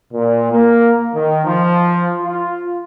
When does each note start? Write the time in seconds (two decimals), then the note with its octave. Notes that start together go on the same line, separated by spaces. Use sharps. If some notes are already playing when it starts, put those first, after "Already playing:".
0.13 A#2
0.52 A#3
1.14 D#3
1.45 F3
2.21 F4